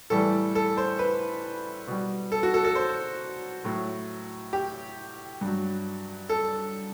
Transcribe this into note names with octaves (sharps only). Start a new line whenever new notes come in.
A2 E3 G3 A4
A4
C5
B4
B2 G3
A4
F#4
A4
A4
C5
A2 F#3
G4
G2 F#3
A4